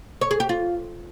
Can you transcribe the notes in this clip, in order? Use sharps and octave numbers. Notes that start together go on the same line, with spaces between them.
C#5
G#4
G4
F4